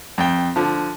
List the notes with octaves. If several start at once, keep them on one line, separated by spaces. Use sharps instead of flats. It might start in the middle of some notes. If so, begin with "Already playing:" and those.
F2 G5
D3 F3